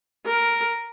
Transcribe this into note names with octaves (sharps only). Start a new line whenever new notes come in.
A#4